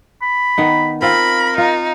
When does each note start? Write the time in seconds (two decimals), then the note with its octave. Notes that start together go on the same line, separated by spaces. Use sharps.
0.22 B5
0.58 D#3 B3 D#4
1.02 C4 F4 A#4 B5
1.58 D#4 F4